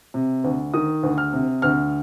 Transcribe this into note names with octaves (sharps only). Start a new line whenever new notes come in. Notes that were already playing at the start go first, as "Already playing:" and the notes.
C3
D2
D#3 D#6
D2
F6
C3
D2 F6